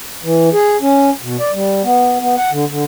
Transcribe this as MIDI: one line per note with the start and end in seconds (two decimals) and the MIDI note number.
0.24 0.49 52
0.53 0.77 68
0.81 1.10 61
1.22 1.37 47
1.40 1.52 74
1.53 1.82 55
1.84 2.18 59
2.20 2.36 59
2.37 2.51 78
2.52 2.65 50
2.70 2.84 50